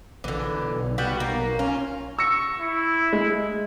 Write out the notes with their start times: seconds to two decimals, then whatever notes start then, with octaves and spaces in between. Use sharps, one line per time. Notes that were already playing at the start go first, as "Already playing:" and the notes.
0.24 A#1 D3 E3
0.54 B1
0.98 G3 B3 F#4
1.20 A#3
1.59 C#4 F4
2.19 C#6 E6 A#6 C#7
2.58 E4
3.13 G#3